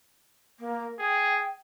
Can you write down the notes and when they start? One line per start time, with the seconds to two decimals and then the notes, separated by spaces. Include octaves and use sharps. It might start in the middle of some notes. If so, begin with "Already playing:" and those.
0.59 A#3
0.99 G#4 G5